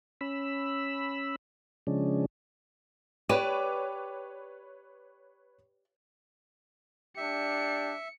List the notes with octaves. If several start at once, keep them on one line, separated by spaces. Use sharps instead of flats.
C#4 B5 E6
C#3 F3 G#3 C#4 D4
G4 B4 C#5 D5 D#7
D4 G4 D5 E5 C#7